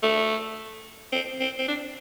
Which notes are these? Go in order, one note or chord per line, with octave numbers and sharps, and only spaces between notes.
A3
C4
C4
C4
D4